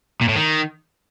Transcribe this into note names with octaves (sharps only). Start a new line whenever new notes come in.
A#2
A2
D#3